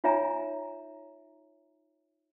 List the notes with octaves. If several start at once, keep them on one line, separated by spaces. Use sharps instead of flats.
D#4 F4 C#5 E5 G#5 A#5